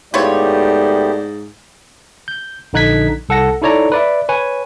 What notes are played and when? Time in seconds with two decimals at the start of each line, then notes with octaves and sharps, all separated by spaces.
0.14 G#2 A3 B3 E4 F4 G4 C#5 D5
2.28 G6
2.73 A#1 D3 D#4 F#6 G#6 B6
3.29 C2 A4 F#5 A#6
3.62 D#4 E4 A4 C#5 D5 A#5
3.92 B4 D5 E5
4.29 B4 C#5 G#5